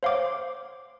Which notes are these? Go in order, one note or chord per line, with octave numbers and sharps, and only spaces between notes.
C5 C#5 F5 F#5 C6 D6